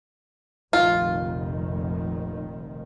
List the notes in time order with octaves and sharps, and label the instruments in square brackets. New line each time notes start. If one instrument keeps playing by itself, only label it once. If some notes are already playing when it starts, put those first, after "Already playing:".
[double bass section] F1 A#1 D#3 [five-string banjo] F4